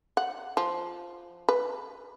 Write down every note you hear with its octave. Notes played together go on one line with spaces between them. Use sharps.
F#5
F3
B4